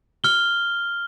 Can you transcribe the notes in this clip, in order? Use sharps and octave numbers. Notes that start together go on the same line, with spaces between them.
F6 G7